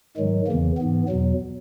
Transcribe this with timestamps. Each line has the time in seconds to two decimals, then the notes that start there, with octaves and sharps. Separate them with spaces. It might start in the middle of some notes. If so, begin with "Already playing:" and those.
0.17 G#2 D#3 F#3 G#3
0.47 E2 C#3 E3 A#3
0.77 G#2 E3 B3
1.09 E2 B2 F#3